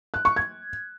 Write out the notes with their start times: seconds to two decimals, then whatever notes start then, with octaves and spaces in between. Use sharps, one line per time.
0.14 F#6
0.25 C#6
0.36 G#6